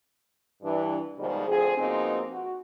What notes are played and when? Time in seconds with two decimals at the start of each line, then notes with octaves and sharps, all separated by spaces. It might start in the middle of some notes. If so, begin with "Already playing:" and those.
0.63 G2 E3 D4
1.18 G#2 B2 D#3 F3 G3 G#3
1.47 D2 F3 C4 G#4
1.77 B2 F3 G#3 A#3 C4 D#4
2.31 F#4